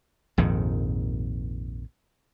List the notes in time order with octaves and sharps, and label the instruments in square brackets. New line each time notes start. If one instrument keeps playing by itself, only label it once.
[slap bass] A#1 F2 G#2 D#3